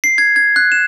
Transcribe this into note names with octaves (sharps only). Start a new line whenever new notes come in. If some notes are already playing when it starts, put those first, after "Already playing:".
C7
G#6
G#6
F#6
E7